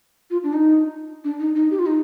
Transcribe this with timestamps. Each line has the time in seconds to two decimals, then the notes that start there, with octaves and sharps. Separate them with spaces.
0.30 F4
0.43 D4
0.54 D#4
1.24 D4
1.40 D#4
1.55 D#4
1.71 G4
1.79 F4
1.86 D#4